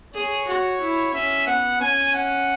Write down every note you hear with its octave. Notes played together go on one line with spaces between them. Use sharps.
G#4 C#5
F#4
E4
C#4 E5
B3 F#5
C#4 G#5
F#5